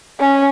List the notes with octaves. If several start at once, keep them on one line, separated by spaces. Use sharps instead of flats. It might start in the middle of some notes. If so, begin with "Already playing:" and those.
C#4